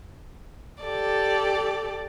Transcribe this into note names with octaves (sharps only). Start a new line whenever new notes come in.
G4 A4 D5